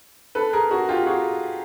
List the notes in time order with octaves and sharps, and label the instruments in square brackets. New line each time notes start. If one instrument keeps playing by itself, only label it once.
[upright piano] A4 B4
G#4 A#4
F#4 G#4
F4 G4
F#4 G#4